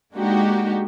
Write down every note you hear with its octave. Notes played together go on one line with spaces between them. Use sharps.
G#3 A#3 D4 D#4 F#4 G4